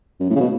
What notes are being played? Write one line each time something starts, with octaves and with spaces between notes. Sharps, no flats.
F#2
A2
C#3
B2